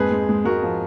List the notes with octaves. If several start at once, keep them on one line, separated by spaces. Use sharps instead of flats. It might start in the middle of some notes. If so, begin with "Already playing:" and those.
Already playing: F2 G#2 G#4 B4
G#3
G#3
G#2 F#4 A#4
F3